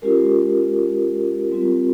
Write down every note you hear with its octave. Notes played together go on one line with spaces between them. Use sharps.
G#3 C#4 F4 G4 A#4
G3 C4 F4